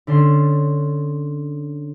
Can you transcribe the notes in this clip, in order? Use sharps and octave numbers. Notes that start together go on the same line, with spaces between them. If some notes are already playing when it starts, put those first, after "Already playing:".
D3 C#4 D4 C6 C7